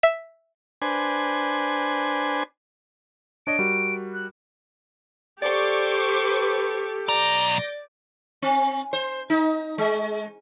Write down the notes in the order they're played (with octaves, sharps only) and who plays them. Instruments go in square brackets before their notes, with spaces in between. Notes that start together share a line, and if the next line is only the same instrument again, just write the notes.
[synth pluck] E5
[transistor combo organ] D4 B4 C5 G#5
[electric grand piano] D4 C#5 D#5 [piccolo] D7
[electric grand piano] G3 F#4 A#4
[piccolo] F#6
[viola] G4 A4 [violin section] C5 C#6 D6 [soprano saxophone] D5
[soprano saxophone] B4
[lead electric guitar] B1 A#5 [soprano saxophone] D5 [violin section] D6 G6 A#6
[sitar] C4
C5
D#4
G#3